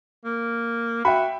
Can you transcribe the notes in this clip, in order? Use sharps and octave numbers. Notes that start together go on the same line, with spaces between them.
A#3
F#4 E5 G5 B5